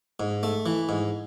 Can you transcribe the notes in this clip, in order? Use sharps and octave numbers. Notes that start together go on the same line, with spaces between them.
G#2
A3
E3
G#2